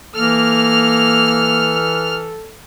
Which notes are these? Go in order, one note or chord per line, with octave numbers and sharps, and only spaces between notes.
E3 A#3 A4 F6